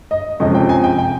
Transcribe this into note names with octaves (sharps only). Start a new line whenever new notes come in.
D#5
F2 C3 F3 G#3 C#4 D#5
G5
G#5
G5
G5